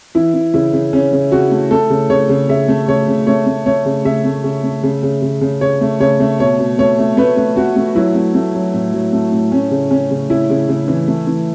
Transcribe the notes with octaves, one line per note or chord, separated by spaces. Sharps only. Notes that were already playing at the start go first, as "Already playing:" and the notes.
E3 E4
E3
C#3 E4
C#3
C#3 C#4
C#3
C#3 F#4
A3
A3 A4
C#3
C#3 C#5
C#3
C#3 E5
A3
C#3 C#5
C#3
A3 C#5
A3
A3 C#5
C#3
C#3 E5
A3
C#3
A3
C#3
C#3
C#3
C#3
C#3 C#5
A3
C#3 C#5
A3
B2 C#5
B2
A3 C#5
A3
A3 B4
A3
A3 F#4
A3
F#3 E4
A3
A3
F#3
A2
F#3
A3
A2
A3 C#4
C#3
C#3 C#4
C#3
C#3 E4
C#3
C#3
E3
A3
E3